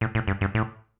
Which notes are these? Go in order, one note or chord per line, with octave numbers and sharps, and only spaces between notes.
A2
A2
G2
G2
A2